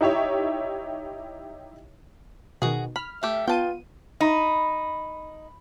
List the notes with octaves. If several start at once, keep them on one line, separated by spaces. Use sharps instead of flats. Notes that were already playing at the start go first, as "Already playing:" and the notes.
D#4 E4 G4 C#5 E5
B2 D#3 F#4 G#4
B5 F6
A3 G4 E5
B3 F4 G5 A5 D#7
D#4 B5